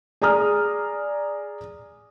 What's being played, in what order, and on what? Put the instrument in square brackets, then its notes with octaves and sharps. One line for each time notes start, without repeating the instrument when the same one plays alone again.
[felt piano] G#4 D5 G#5 A#5 D#6 F6